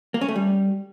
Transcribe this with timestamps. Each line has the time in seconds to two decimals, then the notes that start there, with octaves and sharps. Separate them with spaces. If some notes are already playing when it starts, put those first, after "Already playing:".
0.14 A#3
0.21 C#4
0.28 A3
0.36 G3